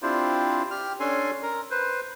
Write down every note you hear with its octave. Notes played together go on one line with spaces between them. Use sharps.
C4 D4 E4 F4 G4 C5
G4 F6
C#4 D4 A4 G#5 C6
A#4
B4 C5